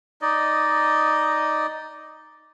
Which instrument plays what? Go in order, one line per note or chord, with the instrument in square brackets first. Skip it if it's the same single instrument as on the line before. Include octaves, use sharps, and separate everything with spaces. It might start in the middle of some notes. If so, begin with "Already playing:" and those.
[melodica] D#4 D5 D#5